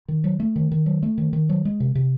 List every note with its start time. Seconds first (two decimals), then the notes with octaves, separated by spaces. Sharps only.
0.08 D#3
0.24 F#3
0.40 A3
0.56 D#3
0.72 D#3
0.86 F#3
1.03 A3
1.18 D#3
1.33 D#3
1.49 F#3
1.65 G#3
1.80 C3
1.95 C3